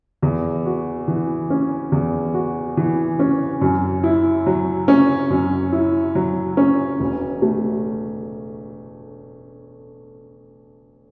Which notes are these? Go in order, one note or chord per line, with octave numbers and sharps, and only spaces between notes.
E2
F#4
E3
C#4
E2
F#4
E3
C#4
F#2
E4
F#3
C#4
F#2
E4
F#3
C#4
E1
A3